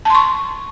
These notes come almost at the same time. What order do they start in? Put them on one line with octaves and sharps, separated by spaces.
A5 C6 C#6